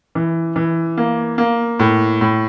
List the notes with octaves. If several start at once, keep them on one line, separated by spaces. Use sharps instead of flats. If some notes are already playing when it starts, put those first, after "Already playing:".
E3
E3
A#3
A#3
A2
A2